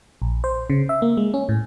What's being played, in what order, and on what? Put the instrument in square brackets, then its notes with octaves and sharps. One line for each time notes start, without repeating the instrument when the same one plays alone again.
[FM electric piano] A#1
C5
C#3
E5
A#3
G#3
C#4
A2